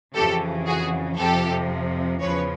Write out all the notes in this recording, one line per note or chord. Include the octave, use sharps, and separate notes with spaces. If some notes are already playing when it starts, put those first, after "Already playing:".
F2 C#3 E3 G4 A4
F#4 G#4
F2 C3 F3 G4 A4
E2 C#3 F3 B4 C#5